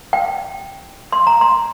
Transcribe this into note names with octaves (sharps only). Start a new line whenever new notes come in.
G5
C6
A#5
C6